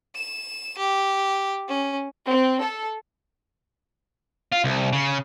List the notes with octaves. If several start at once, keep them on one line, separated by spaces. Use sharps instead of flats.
E7
G4
C#4
C4
A4
F4
C2
C#3